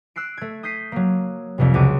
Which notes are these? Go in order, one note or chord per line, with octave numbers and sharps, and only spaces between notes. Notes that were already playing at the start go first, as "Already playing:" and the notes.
E6 F#6 C7 D7
A3 G#6
D#6 G6 B6 C7 D#7
F#3 A#3
C2 F2 C3
C#2 F#4 D6 D#7